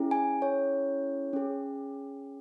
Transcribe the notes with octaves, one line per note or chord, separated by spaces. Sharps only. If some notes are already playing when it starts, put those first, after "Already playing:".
Already playing: C#4 E4 G#4
G#5
C#5
C#4 G#4